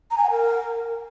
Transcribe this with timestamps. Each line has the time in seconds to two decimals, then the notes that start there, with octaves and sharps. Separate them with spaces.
0.11 A#5
0.17 G#5
0.24 F#5
0.30 A#4